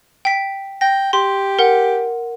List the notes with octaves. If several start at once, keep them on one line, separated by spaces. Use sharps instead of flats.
G5 B6
G5 A#6
G4 C6
A#4 F#5